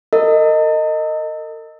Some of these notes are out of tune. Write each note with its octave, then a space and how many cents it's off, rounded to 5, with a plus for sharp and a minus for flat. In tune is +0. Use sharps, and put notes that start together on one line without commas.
A#4 -45 D#5 +0